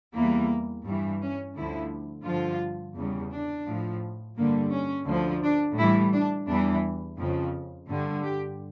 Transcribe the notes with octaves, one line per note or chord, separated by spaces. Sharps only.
E2 E3 G3 A#3
G2 E3 G3
C#4
D2 D3 F3 E4
G2 D3 F3 F4
E2 C#3 G3
D4
A2 F3
G2 D3 G3 A#3
C#4
D2 D3 F3
D4
A2 E3 G3 E4
D4
E2 E3 G3 D4
F2 C#3 F3
G2 D3 G3
G4